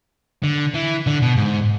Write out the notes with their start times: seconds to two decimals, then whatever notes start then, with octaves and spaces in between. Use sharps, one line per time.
0.44 D3
0.74 E3
1.07 D3
1.22 B2
1.37 G#2